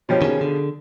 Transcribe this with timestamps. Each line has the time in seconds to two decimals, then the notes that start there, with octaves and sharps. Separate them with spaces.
0.09 B2 F3 G3 C#5
0.22 D#3 C#4 G#4
0.41 D3